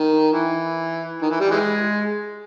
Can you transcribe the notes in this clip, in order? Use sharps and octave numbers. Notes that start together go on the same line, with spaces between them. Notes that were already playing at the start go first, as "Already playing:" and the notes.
Already playing: D#3
E3
D#3
E3
G3
E3 G#3